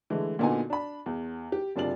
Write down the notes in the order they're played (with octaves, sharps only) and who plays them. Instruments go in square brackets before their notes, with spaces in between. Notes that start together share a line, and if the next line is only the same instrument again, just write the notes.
[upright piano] D3 E3 G#3 A3
A#2 D3 B3 D#4 F#4 G#5
D4 B5
E2
G4
F#1 C3 D4 F4 D5 F#7